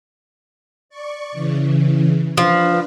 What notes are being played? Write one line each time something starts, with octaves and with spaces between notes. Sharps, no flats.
D5 C#6
C#3 E3
F3 D4 B4